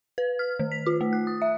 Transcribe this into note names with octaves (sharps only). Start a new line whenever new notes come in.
B4
F6
D#3
B6
F4
A3
F#6
D#6
E5